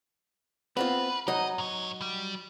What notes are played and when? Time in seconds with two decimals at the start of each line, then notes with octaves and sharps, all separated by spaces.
0.77 B3 C4 F4 B4
1.28 F#3 D#4 D#5
1.58 G#2 C#5
2.01 G3